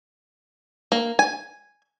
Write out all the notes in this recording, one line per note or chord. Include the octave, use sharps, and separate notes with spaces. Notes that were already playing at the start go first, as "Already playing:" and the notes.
A#3
G#5